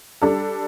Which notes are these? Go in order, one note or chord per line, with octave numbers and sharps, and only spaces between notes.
G3 D4 A4